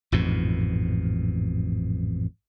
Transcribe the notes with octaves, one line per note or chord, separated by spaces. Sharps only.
A1 F2 G#2 B2